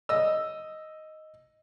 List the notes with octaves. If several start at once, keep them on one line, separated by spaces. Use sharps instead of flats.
D#5 E6